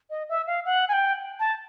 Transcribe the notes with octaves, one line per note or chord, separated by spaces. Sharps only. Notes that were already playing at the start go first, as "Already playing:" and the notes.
D#5
E5
F5
F#5
G#5
G5
A5